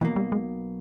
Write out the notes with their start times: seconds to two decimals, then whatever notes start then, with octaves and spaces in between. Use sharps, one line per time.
0.01 B1 B2 E3 A#3
0.16 G3
0.32 G#3